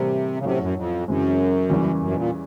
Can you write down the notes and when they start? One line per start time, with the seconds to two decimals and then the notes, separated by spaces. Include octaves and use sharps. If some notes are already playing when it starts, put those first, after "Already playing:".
Already playing: A2 C3 E3 G3 A#3
0.40 C#3
0.45 A2 C3 F#3 A3 C#4
0.60 F#2
0.76 F2
1.07 F#2 C#3 E3 G#3 C4
1.70 E2 C#3 E3 G3 A#3
2.01 F#2
2.11 B2
2.16 A#2